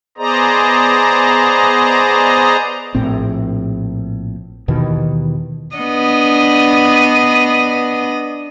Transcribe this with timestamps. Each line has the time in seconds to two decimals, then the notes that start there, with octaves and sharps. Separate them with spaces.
0.18 B3 G#4 C5 D5 D#5 A#5
2.95 A#1 A2 C4
4.68 D#2 B2 D#3 E3
5.75 B3 D4 D#5